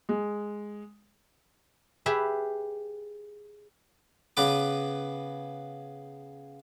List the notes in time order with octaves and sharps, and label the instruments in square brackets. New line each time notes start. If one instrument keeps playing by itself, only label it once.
[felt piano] G#3
[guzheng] G4 G#4 B4 E5
[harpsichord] C#3 B3 B4 D6